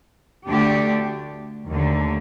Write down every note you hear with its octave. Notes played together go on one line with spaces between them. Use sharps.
D2 D3 A3 D4 G4
D#2 D3 A3